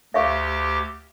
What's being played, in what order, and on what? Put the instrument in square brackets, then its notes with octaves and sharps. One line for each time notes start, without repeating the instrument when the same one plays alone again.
[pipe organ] D2 G4 [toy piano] E5 F5 C#6